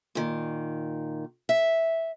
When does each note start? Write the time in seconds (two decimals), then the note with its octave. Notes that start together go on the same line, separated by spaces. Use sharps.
0.15 A#2 D#3
1.49 E5